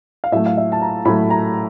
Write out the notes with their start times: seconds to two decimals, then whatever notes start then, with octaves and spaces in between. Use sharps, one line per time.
0.24 F5
0.32 A2 F#3 A3 E5
0.46 F5
0.57 E5
0.72 A5
0.82 A#5
1.05 A2 F#3 A3 B5
1.30 A#5